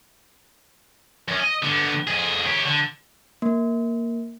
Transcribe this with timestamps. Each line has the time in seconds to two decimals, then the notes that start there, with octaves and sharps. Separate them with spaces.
1.28 F#2 C#4
1.40 D#5
1.62 D3 B3
2.07 F2 G#4
2.47 G4 C#5
2.66 D3
3.42 A#3